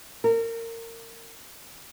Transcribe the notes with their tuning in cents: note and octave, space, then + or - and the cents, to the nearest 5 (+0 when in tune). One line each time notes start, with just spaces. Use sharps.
A#4 -30